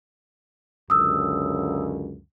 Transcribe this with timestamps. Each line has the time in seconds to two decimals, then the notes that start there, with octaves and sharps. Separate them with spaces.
0.90 C#2 F#2 D3 D#6 E6